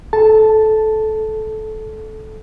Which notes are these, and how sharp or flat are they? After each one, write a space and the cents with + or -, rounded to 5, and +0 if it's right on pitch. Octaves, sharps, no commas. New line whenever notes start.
A4 -20 A5 +0